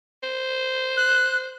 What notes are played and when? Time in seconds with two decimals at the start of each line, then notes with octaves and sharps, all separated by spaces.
0.23 C5
0.97 F#6